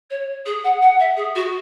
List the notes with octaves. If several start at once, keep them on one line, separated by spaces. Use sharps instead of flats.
C#5
G#4
F#5
F#5
E5
G#4
F#4